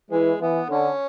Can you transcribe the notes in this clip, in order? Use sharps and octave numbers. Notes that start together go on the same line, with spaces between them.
E3 G#3
E3 B3
D3 C#4